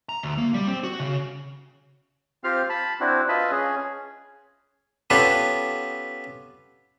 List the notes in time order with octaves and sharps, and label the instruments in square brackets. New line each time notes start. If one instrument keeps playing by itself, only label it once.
[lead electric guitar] A#5
D2
A#3
G3
C4
F#4
C#3
[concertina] C4 F4 G4 F5 F6
A5 B5
C4 D4 E4 F#4
F4 B4 D#5 E5 A5 B5
C#4 G#4
[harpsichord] B3 C#4 F4 G4 A4 B4